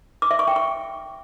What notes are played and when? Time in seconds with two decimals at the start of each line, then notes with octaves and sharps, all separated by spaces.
0.22 D6
0.31 E5
0.39 C#6
0.48 G5
0.56 C#6